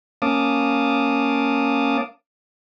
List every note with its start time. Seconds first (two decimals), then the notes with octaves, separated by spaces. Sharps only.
0.22 A#3 C#4 F5 A5 D6 D#6